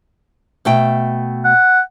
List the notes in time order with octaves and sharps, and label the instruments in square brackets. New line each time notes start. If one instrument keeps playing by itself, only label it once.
[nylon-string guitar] B2 A3 G5
[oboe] F#5